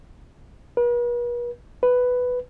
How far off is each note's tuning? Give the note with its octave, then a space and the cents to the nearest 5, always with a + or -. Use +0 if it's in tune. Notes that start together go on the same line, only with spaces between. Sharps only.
B4 -45
B4 +5